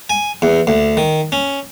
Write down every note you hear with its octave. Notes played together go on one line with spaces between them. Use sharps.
G#5
E2
D2
D#3
C#4